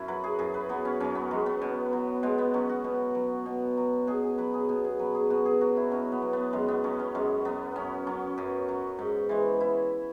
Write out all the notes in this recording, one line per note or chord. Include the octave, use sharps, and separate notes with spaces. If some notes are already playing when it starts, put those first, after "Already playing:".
Already playing: F#2 C#4 E4
F#3 B4
G#4
F#2 G#4
B4
F#3 B3
C#4
F#2 C#4
B3
F#3 G#3
B3
B2
F#3
B2 G#3
B3
F#3 C#4
F#4
B2
F#3
B2
F#3
B2 G#4
G#4
F#3 B4
G#4
B2
G#4
F#3 B4
G#4
B2 F#4
G#4
F#3 F#4
E4
B2 C#4
B3
F#3
B3
F#2 G#3
B3
F#3 C#4
C#4
F#2 G#3
F#3 B3
F#2 C#4
F#3 C#4
F#2
F#3
G#2
E3 G#3
E4